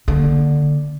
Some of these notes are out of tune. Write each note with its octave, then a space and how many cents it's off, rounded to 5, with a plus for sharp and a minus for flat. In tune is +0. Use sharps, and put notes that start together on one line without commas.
D3 +0 A#3 +0